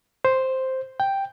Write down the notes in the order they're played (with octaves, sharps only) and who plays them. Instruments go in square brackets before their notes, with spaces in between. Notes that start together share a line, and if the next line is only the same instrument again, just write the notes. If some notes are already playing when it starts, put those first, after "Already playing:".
[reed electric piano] C5
G5